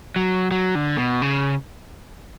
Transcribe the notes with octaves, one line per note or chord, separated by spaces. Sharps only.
F#3
F#3
D3
B2
C#3